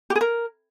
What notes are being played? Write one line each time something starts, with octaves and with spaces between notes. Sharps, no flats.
G4
G#4
A#4